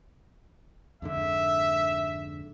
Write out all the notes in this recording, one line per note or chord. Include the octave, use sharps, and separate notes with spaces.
F2 G#2 D3 E5